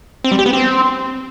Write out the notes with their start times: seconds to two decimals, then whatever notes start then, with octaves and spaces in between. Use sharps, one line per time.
0.24 C4
0.32 G3
0.39 G4
0.46 B3
0.53 C4